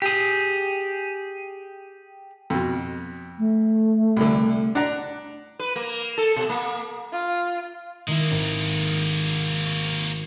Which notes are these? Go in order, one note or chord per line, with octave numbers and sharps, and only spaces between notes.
G4 G#4
F2 B2
A3
C2 D3
D4 F#5 A#5
B4
A#3
A4
B2
A#3
F4
D#3 G#3 A#3 E4
G#1
C#6